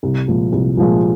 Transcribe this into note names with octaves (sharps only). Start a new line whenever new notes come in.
C2
A#2 F3 G#3
C2
A#2 F3 G#3